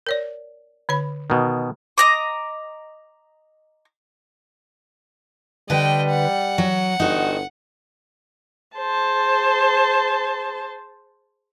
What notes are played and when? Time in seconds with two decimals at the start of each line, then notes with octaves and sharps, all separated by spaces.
0.07 A#4 C#5 D5
0.89 D3 C#5 B5
1.30 B2 D#3
1.98 D#5 A#5 D6
5.70 D3 G3 B4 D#5 G5
6.10 F#5
6.58 F#3
7.00 G1 D#4 F#4
8.77 G#4 C5 A5